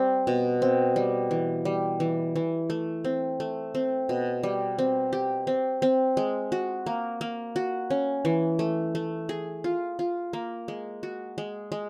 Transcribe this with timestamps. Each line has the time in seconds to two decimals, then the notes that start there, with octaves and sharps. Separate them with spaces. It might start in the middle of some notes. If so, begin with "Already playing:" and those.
Already playing: G3 C4
0.27 B2
0.62 C4
0.96 G3
1.31 E3
1.65 G3
2.00 E3
2.36 E3
2.70 A3
3.05 C4
3.40 A3
3.75 C4
4.09 B2
4.43 G3
4.78 C4
5.13 G4
5.47 C4
5.82 C4
6.17 G#3
6.52 F#4
6.86 A#3
7.21 A#3
7.56 F#4
7.90 C#4
8.25 E3
8.59 A3
8.95 A3
9.29 G#4
9.64 F4
9.99 F4
10.33 A#3
10.68 G#3
11.03 F#4
11.38 G#3
11.72 G#3